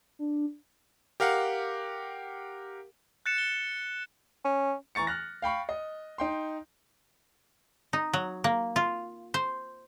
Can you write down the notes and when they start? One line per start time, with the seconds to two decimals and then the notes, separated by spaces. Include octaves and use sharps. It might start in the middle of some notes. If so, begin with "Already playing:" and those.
0.19 D4
1.20 G4 A#4 F5 F#5
3.26 F#6 A6 C#7 E7
3.38 G7
4.45 C#4
4.95 E3 A#5 C#6 A6 C#7
5.07 F6 F#6 A#6
5.42 F5 G5 B5 C#6
5.69 D#5
6.18 D#4 G5 C6
7.93 D#4
8.13 F#3
8.44 A#3
8.76 F4
9.34 C5